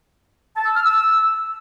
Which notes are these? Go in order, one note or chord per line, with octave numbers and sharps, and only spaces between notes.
A5
E6
F6
E6